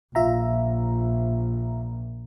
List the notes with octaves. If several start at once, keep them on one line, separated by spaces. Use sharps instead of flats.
A#1 F4 E5 A#5